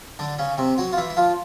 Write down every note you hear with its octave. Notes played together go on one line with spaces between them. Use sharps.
D3 D4
C#3 C#4
C3 C4
F#3 F#4
F4
E3 E4
E4
F3 F4